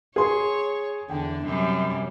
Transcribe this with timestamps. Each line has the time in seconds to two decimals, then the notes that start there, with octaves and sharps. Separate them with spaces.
0.16 G#4 C#5 C6
1.10 E2 D3 D4 G5
1.44 F#2 C3 G3